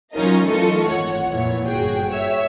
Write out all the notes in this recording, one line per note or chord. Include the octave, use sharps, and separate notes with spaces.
F#3 C#4 D#4 F4 A#4 D#5
E3 A3 F4 A4 D#5 C#6
G#1 C#5 F#5
F2 A#2 E3 C#5
G1 F#4 G#4 G5
C#5 E5 E6